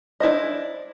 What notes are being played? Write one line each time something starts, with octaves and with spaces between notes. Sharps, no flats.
D4 E4 C5 D#5